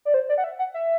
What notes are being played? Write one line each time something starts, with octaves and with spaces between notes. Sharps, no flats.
D5
C5
D5
F#5
E5
F#5
E5